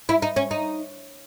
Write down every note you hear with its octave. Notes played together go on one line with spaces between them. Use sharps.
E4
D#4
C#4
D#4